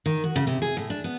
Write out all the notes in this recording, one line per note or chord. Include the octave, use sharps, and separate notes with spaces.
D#3
F#4
C#3
C3
G#4
A2
D4
B3